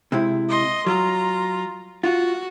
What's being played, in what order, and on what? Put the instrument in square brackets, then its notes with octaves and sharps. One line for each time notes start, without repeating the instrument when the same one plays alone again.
[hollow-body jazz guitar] C3 G#3 E4
[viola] D#5 C6
[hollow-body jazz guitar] F#3 [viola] F4 A#5
[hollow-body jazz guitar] F4 [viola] F#4